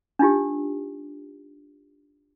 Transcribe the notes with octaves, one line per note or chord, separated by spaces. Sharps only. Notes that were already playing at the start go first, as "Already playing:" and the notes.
D4 D#4 F4 G4